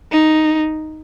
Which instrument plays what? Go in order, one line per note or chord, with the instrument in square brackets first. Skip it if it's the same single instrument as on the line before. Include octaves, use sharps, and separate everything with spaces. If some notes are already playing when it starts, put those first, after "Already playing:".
[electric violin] D#4